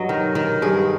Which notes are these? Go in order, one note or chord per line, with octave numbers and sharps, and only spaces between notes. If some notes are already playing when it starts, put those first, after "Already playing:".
Already playing: G2 F#3 D#5
D#3
D#3
G2 G#4